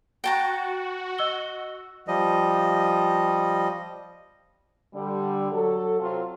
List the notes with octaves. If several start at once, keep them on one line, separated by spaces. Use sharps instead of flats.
F#4 G5 A5 A#5
D#5 E6 G7
F3 G3 D#5
D3 G3
F#3 A4
C3 F#3 C4 F4